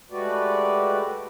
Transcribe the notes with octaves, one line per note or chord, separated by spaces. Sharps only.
G#3 A3 F#4 G4 B4 D5